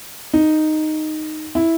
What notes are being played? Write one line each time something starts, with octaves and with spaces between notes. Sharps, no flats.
D#4
E4